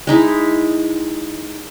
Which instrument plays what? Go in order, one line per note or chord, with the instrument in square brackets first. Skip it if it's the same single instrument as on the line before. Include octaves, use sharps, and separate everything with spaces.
[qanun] G#3 D#4 E4